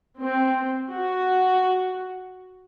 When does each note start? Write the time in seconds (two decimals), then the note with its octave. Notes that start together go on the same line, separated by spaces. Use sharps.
0.20 C4
0.90 F#4